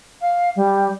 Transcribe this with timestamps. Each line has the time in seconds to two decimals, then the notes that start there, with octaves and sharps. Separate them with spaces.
0.21 F5
0.56 G3